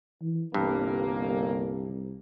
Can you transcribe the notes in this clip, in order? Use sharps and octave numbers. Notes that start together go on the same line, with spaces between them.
E3
G1 C2 G2 A#3